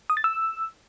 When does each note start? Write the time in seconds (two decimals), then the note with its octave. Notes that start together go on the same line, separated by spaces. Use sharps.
0.10 D#6
0.17 A6
0.24 E6